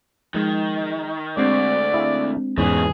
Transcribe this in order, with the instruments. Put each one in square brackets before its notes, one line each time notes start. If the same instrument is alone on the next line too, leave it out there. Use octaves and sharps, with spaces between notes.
[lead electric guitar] D#3 [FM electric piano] F3 G#3
[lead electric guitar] D2 [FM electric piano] G#3 C4 D4 [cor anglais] D5
[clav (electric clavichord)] E4 G#4 F5
[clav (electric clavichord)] E2 G#2 C#4 [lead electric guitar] C#3 B3 [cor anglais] G#4